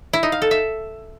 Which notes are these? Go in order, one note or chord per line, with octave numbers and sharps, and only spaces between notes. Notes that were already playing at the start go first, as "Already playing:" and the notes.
E4
D#4
F5
A4
E5